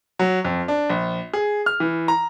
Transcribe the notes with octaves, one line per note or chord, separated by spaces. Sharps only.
F#3
F2
D4
A#1
G#4
F6
E3
A#5